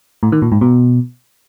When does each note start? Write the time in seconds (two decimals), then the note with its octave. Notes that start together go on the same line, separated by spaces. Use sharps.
0.23 A2
0.32 D#3
0.42 A#2
0.52 G#2
0.61 B2